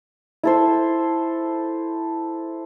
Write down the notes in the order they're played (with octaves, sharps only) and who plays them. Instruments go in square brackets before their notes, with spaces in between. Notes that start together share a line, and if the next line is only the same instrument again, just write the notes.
[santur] E4 A4 C5